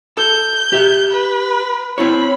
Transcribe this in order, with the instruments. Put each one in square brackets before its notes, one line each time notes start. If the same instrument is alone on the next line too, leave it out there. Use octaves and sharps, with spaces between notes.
[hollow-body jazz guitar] A4 [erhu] G6
[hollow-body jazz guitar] G4 E5
[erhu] B4
[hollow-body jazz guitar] C4 E4 C#5 [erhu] B5